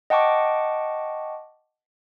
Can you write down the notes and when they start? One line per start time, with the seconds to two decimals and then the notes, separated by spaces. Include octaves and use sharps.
0.10 D#5 F#5 G5 A5 C#6 D6